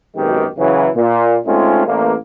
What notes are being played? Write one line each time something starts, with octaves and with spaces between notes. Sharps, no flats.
G#1 F#2 B2 D#3 G#3 G4
C#3 E3 F#3
A#2
G#3 A3 C4 C#4 D#4 F4
A1 A#3